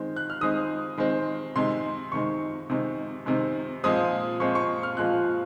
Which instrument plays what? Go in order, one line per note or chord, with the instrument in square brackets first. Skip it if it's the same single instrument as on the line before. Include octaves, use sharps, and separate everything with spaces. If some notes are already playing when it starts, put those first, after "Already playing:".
Already playing: [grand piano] D#3 G#3 C4
F#6
F6
D#3 G#3 C4 D#6
D#3 G#3 C4
C3 D#3 G#3 C6
C3 D#3 G#3 C#6
C3 D#3 G#3
C3 D#3 G#3
A#2 F3 G#3 C4 D#6
A#2 F3 G#3 C4 C#6
C#6
F6
A#2 F3 G#3 C4 F#6